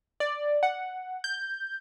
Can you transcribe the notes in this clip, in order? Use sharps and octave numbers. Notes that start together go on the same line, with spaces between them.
D5
F#5
G6